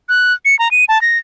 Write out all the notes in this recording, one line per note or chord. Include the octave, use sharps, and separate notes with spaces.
F#6
C#7
A#5
D#7
A5
A#6